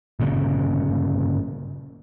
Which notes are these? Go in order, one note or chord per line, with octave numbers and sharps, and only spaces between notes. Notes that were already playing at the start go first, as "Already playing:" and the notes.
G1 A#2 C#3